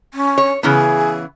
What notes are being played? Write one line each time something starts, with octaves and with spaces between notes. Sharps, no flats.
C#4
C#5
C#3 E3 B3 G#4